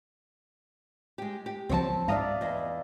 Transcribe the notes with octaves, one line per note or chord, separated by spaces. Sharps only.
G#3 G4
G4
C#2 B2 F3 C4 C#5 A5
G#2 D5 E5 F5 A#5 D#6
E2 D#5